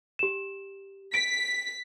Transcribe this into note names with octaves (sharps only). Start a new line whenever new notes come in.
G4 E7
B6 D7